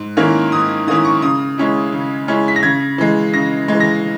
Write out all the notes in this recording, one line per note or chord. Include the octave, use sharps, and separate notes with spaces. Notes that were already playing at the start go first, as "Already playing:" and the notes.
Already playing: G#2
D#3 A#3 C#4 E4
G#2 D#6
D#3 A#3 C#4 E4 D#6
C#6
C#3 D#6
G#3 C#4 E4
C#3
G#3 C#4 E4
B6
A#6
C#3 G#6
E3 G#3
C#3 A#6
E3 G#3
A#6